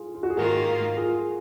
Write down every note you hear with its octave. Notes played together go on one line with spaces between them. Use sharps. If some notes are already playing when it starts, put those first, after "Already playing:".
Already playing: F4 G#4
F4
F#4
G#4
G#2 D#3 A#3 F4 F#4 A#4
F4 G#4